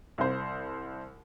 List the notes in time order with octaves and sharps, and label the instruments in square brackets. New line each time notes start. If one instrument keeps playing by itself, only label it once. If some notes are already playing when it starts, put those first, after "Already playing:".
[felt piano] C2 C5